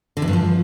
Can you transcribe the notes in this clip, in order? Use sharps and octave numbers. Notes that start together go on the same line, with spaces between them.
D3
E2
G2
F3